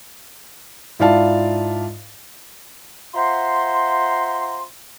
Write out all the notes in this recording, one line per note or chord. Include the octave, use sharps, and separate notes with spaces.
G#2 E4 F4 D5 F5 A5
F4 C5 E5 F#5 A#5 C6